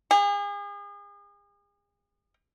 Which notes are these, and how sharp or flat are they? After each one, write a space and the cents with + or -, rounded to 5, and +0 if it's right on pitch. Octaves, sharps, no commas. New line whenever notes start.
G#4 -40